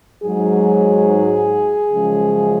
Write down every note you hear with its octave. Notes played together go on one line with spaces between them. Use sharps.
G#2 F#3 G#4
F#2 C#3 F3 G#3